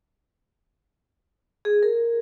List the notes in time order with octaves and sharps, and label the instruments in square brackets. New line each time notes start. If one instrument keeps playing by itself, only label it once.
[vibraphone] G#4
A#4